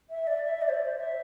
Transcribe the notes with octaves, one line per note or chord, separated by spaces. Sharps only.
E5
D5
E5
D5
C5
D5
C5
E5